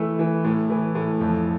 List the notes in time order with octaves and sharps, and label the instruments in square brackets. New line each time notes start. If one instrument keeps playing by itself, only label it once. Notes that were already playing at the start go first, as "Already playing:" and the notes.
Already playing: [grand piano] E3 A3
E3
A2
E3
A2
F2